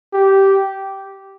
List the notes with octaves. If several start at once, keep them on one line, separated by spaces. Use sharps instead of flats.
G4